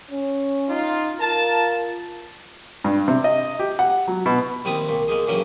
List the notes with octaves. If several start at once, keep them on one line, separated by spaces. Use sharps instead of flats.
C#4
D#4 F4
F4 A#4 A5
G2
C3
D#5
G4
F#5
F#3
B2
D#2 G3 C4 E4 D#6
C2 A#2
G#3 A#3 D#4 G#4
G2 C#3 E3 F#3 A#3 C#4